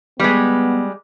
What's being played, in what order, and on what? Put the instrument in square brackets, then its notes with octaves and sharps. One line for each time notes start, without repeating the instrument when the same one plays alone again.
[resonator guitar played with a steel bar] G3 G#3 [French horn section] B3